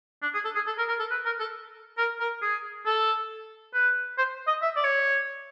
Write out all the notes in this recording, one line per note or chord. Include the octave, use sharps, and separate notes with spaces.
D4
G#4
A4
G#4
A4
A#4
A#4
A4
B4
A#4
A4
A#4
A#4
G#4
A4
B4
C5
D#5
E5
D5
C#5